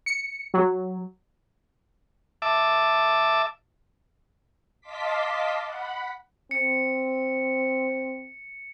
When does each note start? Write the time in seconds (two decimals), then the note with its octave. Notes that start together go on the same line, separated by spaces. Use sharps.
0.06 C#7
0.54 F#3
2.42 E5 A5 D6
4.81 D#5 F5 A5 C6 D6 B6
5.65 F#5 B5
6.51 C4 C#7